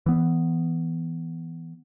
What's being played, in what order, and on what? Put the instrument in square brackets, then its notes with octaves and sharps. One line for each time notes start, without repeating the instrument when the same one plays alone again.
[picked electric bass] E3 B3